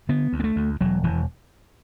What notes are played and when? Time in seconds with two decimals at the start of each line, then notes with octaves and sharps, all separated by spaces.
0.09 D3 B3
0.33 D2
0.40 B3
0.44 A3
0.56 D2
0.81 E1 F#3
1.03 E1 E3